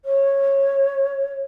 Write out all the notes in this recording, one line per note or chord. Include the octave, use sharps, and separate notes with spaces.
C#5